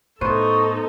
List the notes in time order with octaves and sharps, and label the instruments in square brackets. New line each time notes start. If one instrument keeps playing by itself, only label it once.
[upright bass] A2 [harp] B3 C5 D#7 [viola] D#4 A4 [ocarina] C#6